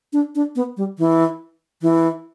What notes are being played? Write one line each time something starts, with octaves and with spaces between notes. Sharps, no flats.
D4
D4
B3
G3
E3
E3